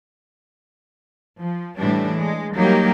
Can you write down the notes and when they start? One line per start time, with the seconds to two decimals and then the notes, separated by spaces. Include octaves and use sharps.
1.40 F3
1.77 A2 E3 G3 D4
2.17 G#3
2.54 F#3 G3 A#3 D#4 G4